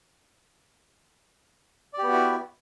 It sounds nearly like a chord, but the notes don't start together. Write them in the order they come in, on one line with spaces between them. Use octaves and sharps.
D5 G4 B3 F#4 E4